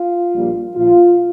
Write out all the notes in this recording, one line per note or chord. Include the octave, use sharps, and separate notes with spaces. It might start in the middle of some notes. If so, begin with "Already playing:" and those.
Already playing: F4
A#1 A#2 G3
A#1 A#2 F3 F4